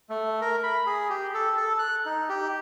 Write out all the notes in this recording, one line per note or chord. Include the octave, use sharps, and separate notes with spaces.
A3
A#4
B5
G#4
G4
A4
A4
F#6
D#4
G4